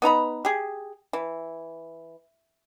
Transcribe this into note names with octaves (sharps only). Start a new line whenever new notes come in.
B3 D#4 A#5 B5
G4 G#4
E3